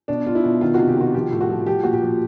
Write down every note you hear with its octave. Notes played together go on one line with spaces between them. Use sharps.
B2 D4
B2 F4
E4
B2
D#3 F4
C3 F#4
G4
D#3 F#4
F3 G4
A2
F#4
F3
F3 G4
A#2 F#4
G4
F3